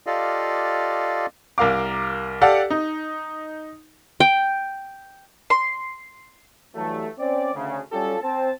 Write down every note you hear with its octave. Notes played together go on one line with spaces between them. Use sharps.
F4 G4 A4 D5 D#5 F5
C2 A#4 F5 D6
G4 A4 D5 F5 F#5
D#4
G5
C6
G2 E3 F#3 G3 A3
C4 C#4 D5
D2 C#3
F#3 G3 C#4 F4 G4 A4
C4 A5